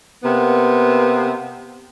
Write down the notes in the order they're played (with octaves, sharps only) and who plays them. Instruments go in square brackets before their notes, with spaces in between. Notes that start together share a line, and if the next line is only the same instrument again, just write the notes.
[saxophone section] C3 A#3 B3